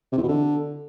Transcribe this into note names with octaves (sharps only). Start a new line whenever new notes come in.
C3
E2
B2
D3